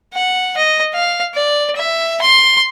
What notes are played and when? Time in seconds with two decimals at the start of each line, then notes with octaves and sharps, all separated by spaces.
0.14 F#5
0.57 D#5
0.94 F5
1.35 D5
1.77 E5
2.22 C6